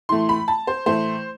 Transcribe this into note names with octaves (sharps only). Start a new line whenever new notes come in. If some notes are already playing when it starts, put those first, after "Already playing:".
A2 E3 A3 C6
B5
A5
C5
A2 E3 A3 C5